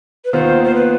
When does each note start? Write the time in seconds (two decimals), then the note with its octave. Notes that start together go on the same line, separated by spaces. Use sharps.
0.25 B4
0.32 D#2 D#3 B3 F4 C5
0.64 C5
0.75 B4